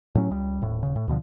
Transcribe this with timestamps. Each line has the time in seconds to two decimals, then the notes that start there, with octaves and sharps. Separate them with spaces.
0.15 A2 F#3 C#4
0.31 C#2 G3
0.62 D#1 A2
0.83 D#1 C#3
0.96 A2
1.08 D2 B2 D3 F3